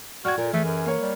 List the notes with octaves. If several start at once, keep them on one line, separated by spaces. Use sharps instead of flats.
F#4 D5 G5 F6 G#6
A#2 A#4
E3 A3 G#4
F#2
A#3 C#5
G3